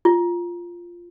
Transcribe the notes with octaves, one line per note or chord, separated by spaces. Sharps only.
F4